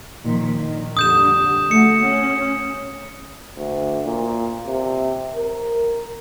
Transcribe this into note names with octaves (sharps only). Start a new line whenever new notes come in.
A#2 D#3 F3
D#3
F2 D3 G3 D#6 G6 E7
A3 F#4 C#7
C#4
D2
A#2
C3
A#4